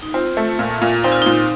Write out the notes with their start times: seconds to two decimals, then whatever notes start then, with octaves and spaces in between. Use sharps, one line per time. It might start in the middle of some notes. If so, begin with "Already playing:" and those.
0.03 D#4
0.14 C4 F4
0.37 A3
0.59 A#2
0.82 A#2
1.04 C4 D#4
1.12 F4
1.22 A#2 D#4